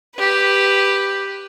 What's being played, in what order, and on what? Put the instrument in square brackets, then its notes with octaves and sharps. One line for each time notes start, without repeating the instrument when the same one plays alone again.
[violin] G4 B4